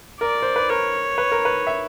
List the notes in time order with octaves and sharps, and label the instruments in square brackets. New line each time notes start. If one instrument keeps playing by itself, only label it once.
[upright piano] A#4 [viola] D5
[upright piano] C5
B4
[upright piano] A#4 [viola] C#5
[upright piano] B4
A#4
B4
E5